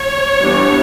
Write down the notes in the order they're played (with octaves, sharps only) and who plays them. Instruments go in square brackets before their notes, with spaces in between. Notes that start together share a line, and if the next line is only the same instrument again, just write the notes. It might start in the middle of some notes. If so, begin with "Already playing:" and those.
Already playing: [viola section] C#5
E3 G3 B3 D4